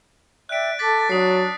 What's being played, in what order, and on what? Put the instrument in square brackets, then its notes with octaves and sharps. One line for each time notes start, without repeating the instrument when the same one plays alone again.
[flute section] D5 E5 G5 [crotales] F#6 D7
[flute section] A4 D6 [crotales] A6 B6
[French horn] F#3 [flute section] D4 [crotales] D#6 C7